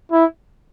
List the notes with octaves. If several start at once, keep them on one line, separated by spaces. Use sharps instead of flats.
E4